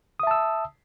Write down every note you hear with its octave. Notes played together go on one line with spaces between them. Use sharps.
E5 A5 D#6 E6